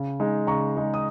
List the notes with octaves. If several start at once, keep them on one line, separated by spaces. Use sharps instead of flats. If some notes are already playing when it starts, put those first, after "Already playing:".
Already playing: C#3
G#3 D#4
C#3 A#5 C#6
G#3 D#4
D#6